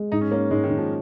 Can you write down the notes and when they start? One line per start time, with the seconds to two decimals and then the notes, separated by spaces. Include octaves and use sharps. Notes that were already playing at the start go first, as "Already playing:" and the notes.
Already playing: G#3
0.12 G#2 D#4
0.21 C#4
0.31 A#3 C#4
0.51 G#2 G#3
0.64 D#3
0.70 G#2
0.77 F3